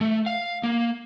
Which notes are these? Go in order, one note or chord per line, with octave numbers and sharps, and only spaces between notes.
A3
F5
A#3